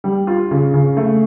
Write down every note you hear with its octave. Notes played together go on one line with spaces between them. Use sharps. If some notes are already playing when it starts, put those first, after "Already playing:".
G3
F4
C#3
C#3
A3